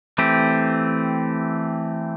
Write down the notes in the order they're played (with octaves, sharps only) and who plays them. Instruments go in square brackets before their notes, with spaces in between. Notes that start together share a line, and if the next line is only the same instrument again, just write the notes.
[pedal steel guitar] E3 A3 C4 G4